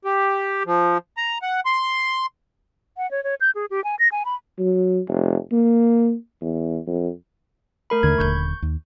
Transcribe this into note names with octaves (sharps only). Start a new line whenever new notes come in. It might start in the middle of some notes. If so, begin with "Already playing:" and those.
G4
F3
A#5
F#5
C6
F#5
C#5
C#5
G6
G#4
G4
G#5
A#6
G#5
B5
F#3
F1
A#3
E2
F2
A3 A#4 B5
D#2 D3 B5 G#6
D#1 A#1 D3 C#6 G6
D#2